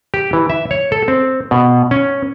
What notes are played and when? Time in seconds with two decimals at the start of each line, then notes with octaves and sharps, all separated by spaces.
0.14 G4
0.33 E3
0.50 E5
0.71 C#5
0.92 A4
1.08 C4
1.51 B2
1.91 C#4